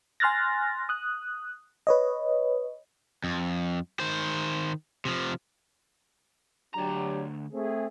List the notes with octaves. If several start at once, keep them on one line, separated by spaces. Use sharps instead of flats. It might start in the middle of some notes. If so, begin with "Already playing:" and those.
G#5 C6 F6 F#6 A6 A#6
D#6 F#6
B4 C#5 D#5
F2
D#3 C5
C3 F3
D2 F#3 D4 G4 A#5
A3 C4 G#4